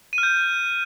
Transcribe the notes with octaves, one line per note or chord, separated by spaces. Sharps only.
D#7
F6
G6